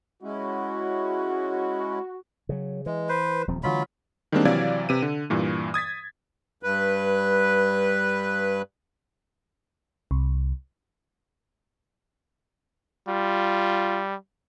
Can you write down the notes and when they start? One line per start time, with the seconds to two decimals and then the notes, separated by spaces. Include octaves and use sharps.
0.23 G#3 C#4 E4 F#4
2.49 C#3 F#3
2.86 E3 G#3
3.09 B4 C5
3.48 D#1 F3 C4
3.63 D3 E3 F#3 G#3 F4 B5
4.32 D#3 G3 G#3 A#3 C4 D4
4.45 C3 E3 F#3 D5 F5 G#6
4.89 C3 B4 D#7
5.02 D3
5.30 G2 A#2 E3
5.74 D#6 G#6 A6 B6
6.63 G2 B4
10.11 C2
13.08 G3 F4